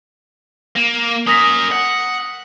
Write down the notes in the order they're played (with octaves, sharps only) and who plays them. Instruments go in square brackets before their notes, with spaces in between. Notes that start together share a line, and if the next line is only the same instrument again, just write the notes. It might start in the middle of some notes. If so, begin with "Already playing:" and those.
[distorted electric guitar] A#3
[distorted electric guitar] C#4 A#4 [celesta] D#6 A#6 B6
[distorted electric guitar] F#5